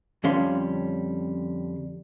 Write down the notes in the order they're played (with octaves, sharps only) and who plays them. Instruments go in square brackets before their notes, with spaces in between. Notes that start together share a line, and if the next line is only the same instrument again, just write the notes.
[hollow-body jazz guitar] F2 D3 G3 C#4 F5 C6